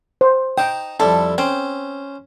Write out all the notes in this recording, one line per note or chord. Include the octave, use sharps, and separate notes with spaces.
C5
D#4 G5 A5 D#6
F2 G3 E4 A4
C4 C#4 C5